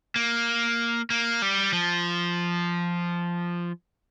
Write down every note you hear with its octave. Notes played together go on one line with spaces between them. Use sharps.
A#3
A#3
G3
F3